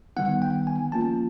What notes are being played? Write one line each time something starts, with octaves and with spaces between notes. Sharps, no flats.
D#3 G3 B3 D#4 F#5
G5
G#5
F3 A#3 C#4 F4 A5